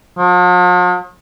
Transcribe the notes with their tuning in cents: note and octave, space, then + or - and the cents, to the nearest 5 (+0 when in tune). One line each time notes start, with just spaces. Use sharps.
F3 +45